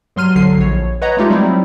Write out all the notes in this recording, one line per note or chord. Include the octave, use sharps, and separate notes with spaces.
G2 F#3 C6 F6 D#7
C2 D3 F#3 C7
A#1 C#5
B4 C#5 D#5 F#5 A#5
G#3 A3 D#4 F4 G4
F#3 G3 C4 D#4 E4